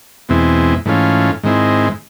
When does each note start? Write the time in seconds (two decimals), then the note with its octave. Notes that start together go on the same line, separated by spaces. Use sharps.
0.29 E2 B2 G#3 C4 E4
0.85 G#2 E3 A3 C#4 F4
1.43 G#2 D#3 G#3 C4 E4